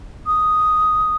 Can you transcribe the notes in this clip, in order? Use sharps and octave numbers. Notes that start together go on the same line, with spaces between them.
D#6